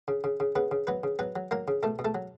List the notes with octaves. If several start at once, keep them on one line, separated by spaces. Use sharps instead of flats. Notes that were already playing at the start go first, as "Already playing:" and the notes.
C#3
C#3
C#3
C#3 B3 B4
C#3
F#3 B3 B4
C#3
F#3 B3 B4
F#3
F#3 A#3 A#4
C#3
B2 A3 A4
B2
A3 A4
F#3